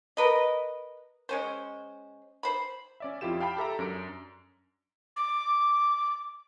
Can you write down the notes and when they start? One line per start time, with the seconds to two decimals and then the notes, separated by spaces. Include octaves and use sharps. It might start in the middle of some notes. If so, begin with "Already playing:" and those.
0.17 A#4 B4 D#5
1.29 G#3 C#4 C5
2.43 C5 B5
3.00 C#4 D5 E5
3.21 F2 E4 F4 G4 E7
3.40 F5 G5 A5 B5
3.57 G4 A4 E5 A#5
3.79 F#2 D4 D7
5.16 D6